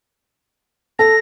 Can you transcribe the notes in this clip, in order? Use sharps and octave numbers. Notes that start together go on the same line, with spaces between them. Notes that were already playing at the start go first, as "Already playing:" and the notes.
A4 A#6